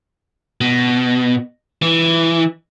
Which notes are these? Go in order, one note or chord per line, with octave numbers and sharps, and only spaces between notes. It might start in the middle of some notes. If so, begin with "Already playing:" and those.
B2
E3